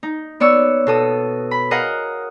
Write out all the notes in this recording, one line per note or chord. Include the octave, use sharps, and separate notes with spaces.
D#4
B3 C#5 D5 C#6 E6
B2 A4 D#6
B5
G#4 A#4 D#5 F5 F#5